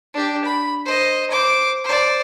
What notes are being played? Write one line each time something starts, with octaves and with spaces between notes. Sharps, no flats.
D4 G4
B5
C5 D#5
C5 D6
C5 D5